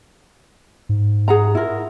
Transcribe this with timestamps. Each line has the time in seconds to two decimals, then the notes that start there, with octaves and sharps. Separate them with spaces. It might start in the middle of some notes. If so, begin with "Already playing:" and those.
0.89 G#2
1.28 G#4 F#5 A#5
1.55 E4 F4 A#4